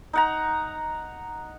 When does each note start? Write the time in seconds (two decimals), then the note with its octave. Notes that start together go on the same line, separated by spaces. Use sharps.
0.13 D#4 F#5 A#5